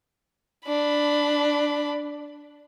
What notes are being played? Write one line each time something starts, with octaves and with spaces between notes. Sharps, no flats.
D4 B5